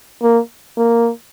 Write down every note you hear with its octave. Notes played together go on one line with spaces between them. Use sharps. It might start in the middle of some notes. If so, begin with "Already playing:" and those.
A#3
A#3